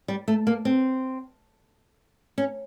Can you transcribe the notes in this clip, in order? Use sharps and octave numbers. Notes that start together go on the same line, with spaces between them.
G3
A3
A#3
C4
C#4